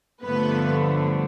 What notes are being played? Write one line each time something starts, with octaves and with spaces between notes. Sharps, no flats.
G2 D3 F3 A3 B3 B4